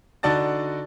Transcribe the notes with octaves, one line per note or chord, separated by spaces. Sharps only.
D3 D#4 F#4 D5 A5 A6